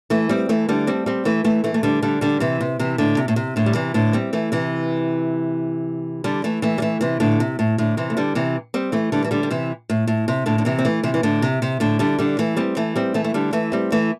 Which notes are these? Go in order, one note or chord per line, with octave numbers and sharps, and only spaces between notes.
E3 A3
G3 C4
E3 A3
D3 G3
G3 C4
G3 C4
E3 A3
E3 A3
E3 A3
A3
D3 G3
D3 G3
D3 G3
C3 E3
C3
C3 E3
A2 D3
C3
A2
C3
A2 D3
G3
C3 E3
A2 D3
G3 C4
E3 A3
C3 E3
D3 G3
E3 A3
E3 A3
G3
E3 A3
C3 E3
A2 D3
C3
A2
A2 D3
C3 E3
A3
D3 G3
C3 E3
G3 C4
E3 A3
D3 G3
E3
D3 G3
G3
C3 E3
A2
A2
C3
A2 D3
D3
C3 E3
C4
E3 A3
C3 E3
E3
A2 D3
C3
C3
A2 D3
D3 G3
D3 G3
E3 A3
G3 C4
E3 A3
G3 C4
E3 A3
A3
D3 G3
E3 A3
G3 C4
E3 A3